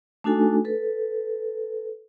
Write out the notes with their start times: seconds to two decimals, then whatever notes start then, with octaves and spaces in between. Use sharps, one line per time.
0.24 A3 D4 D#4 F#4 A4 G#5
0.65 A4 B4